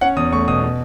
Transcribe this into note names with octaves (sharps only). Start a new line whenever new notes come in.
C#4 F#5
E2 D#6
A3 C#6
B2 D#6
B2